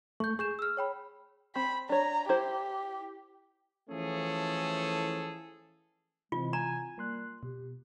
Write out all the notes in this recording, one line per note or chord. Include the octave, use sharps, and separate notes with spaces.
A3 C#6 G6
G#4 C#6 G6 E7
E6 F6
C#5 G5 B5
C4 B5
D4 C#5 A#5
E4 G4 C5
E3 F3 A3 C#4 G#4 A4
C3 E3 G#3 C4 F4
G#5 A#5
G3 A#3 C6 F#6
B2 G4